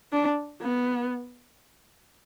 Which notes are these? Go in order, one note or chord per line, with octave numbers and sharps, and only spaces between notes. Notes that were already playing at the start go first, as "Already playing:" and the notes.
D4
B3